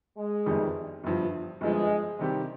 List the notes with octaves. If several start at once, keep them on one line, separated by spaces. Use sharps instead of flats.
G#3
G1 F2 D#3 G3
G1 G2 F3
G1 G2 F3 G#3
C3 D#3 G3 C4 G4